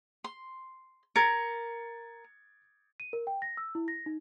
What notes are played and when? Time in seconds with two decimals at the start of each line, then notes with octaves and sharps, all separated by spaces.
0.24 C6
1.16 A#4 G#6 A6 C#7
3.00 D#7
3.13 A#4
3.27 G5
3.42 A#6
3.57 E6
3.75 E4
3.88 A#6
4.06 D#4